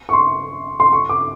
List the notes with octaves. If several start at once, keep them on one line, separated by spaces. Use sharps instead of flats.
C#6
C6
C6
C#6
D6